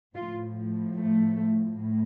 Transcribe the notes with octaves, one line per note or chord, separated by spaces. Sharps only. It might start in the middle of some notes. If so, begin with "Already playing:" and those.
A2 F3 F4
A3
A2